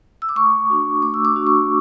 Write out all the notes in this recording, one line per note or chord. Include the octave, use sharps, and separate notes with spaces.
E6
D6
A3 C#6
D4 F#4
A3 D6
E6
D6
D4 F#4
C#6